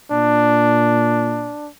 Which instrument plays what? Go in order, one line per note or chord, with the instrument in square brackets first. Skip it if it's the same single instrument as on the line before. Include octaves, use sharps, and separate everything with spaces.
[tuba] A#2 [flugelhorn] D4